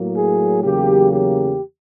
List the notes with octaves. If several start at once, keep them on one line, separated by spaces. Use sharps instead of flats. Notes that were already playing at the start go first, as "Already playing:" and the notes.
Already playing: A2 F#3 A#3
G#4
E2 C#3 F#3 A#3 G4
G4